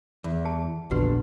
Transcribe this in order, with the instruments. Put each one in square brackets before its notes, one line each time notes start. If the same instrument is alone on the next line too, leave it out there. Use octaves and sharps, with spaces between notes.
[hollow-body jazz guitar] E2
[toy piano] G#4 A5
[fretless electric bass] A#1 E2 A#2 [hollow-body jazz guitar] D3 [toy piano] F#4 G4 B4